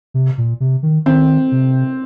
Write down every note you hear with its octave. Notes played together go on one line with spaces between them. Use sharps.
C3
A#2
C3
D#3
D#3 C4
C3